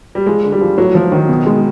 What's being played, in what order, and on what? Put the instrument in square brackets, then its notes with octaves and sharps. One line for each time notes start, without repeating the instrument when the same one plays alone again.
[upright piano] G3
[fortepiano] F3 [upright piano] G#3
[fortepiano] D3
[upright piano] G3
[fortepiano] F3
[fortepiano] A2 [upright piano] F#3
[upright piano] F3 [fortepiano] F#3
[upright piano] D#3 [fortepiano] F#3
[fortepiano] B2
G#3